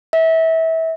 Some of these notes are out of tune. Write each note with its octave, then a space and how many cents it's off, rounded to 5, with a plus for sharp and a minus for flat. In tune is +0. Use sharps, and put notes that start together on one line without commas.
E5 -25